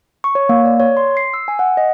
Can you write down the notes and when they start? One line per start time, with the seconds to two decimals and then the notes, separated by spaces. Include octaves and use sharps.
0.24 C#6
0.35 C#5
0.49 A#3
0.65 D5
0.80 C#5
0.97 C6
1.17 C7
1.34 E6
1.48 G#5
1.59 F#5
1.77 D#5